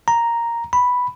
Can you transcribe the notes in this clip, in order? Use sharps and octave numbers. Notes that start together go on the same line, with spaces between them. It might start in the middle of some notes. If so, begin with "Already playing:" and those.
A#5
B5